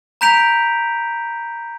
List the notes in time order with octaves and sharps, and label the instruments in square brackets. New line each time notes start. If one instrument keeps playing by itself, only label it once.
[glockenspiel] A#5 B5 G6 B6 D7 F7